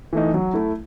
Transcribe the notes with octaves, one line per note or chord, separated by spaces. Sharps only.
E3 A3 D#4
F#3
A3 E4